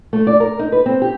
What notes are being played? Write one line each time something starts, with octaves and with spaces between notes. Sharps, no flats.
A3
D5
A#4
D#4
B4
C4
G4